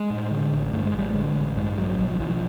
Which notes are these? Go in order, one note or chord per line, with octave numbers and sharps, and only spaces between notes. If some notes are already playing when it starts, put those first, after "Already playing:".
Already playing: G#3
A2
D3
A1
G2 A3
G#3
A1 G3
D3 G#3
A1
G2 G#3
A1 F#3
B1 F#3
F3
B1 E3
F3